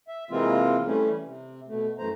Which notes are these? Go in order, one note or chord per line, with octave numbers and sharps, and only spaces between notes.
E5
C3 E3 G#3 A#3 C4 F4
E3 G3 A3 C#4
C3
B2 A3
F#2 E3 A3 C5 A#5